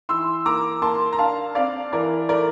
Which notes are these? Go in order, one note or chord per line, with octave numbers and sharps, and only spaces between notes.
E3 C6 E6
A#3 A#5 D6
A#3 A5 C6
A#5
D4 F5 A5
C4 D5 F5
E3 A#4 D5
A3 A#4 D5